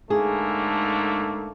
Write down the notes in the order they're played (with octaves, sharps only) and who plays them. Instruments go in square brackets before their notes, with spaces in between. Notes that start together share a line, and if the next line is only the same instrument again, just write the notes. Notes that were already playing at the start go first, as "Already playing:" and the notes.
[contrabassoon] G#2 [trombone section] D3 A3 A#3 [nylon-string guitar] G#4